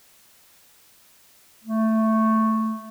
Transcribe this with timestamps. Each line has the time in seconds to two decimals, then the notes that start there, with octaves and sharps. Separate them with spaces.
1.64 A3